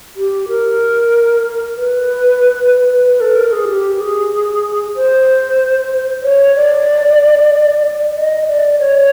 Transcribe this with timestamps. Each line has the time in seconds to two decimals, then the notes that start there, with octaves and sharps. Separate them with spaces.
0.16 G4
0.49 A#4
1.76 B4
3.04 B4
3.21 A4
3.36 A#4
3.52 G#4
3.68 G4
4.00 G#4
4.96 C5
6.23 C#5
6.56 D5
8.15 D#5
8.47 D5
8.79 C#5